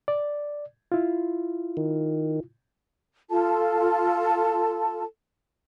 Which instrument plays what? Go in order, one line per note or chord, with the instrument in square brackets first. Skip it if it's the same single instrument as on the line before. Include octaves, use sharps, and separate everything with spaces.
[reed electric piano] D5
E4 F4
[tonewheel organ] D#3
[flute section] F4 A4 A5